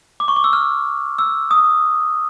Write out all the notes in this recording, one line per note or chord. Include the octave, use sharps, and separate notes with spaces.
D6
C#6
D6
E6
F6
E6
D#6